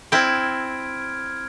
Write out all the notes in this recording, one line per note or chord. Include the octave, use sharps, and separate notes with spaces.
C4 E4 F6 G#6 D7